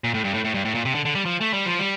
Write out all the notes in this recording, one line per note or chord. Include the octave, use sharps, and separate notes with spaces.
A#2
A2
G2
A2
A2
G2
A2
A#2
C3
D3
D3
G3
F3
A3
G3
F3
G3